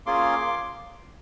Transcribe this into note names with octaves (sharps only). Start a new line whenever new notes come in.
A#3 C#4 F4 G#4 C6 D6